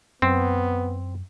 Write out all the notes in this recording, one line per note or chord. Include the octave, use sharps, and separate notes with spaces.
F#2 B3 C4